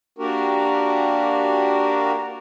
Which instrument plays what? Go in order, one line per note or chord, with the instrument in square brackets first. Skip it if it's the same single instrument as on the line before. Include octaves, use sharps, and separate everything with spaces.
[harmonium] A#3 D4 F#4 G4 A#4